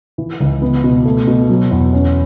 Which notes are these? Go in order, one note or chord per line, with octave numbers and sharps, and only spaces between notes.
E3
C#2
B3
B2
A3
B2
F#3
E2
C#4